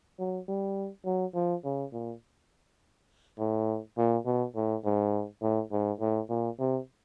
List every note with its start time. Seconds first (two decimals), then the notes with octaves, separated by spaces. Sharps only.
0.19 F#3
0.48 G3
1.06 F#3
1.35 F3
1.65 C#3
1.93 A#2
3.39 A2
3.97 A#2
4.26 B2
4.55 A2
4.85 G#2
5.42 A2
5.72 G#2
6.00 A2
6.29 A#2
6.59 C3